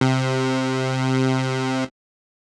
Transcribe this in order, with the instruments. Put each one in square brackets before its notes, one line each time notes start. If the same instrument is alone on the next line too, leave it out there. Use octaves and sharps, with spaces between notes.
[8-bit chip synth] C3